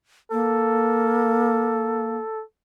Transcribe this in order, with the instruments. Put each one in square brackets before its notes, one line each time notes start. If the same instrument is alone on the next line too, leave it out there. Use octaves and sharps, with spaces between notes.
[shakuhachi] A#3 [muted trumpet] A4